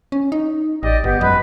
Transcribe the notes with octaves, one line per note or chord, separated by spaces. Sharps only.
C#4
D#4
A1 G4 D5 D#5
G1 B3 G4
F#2 G#3 B4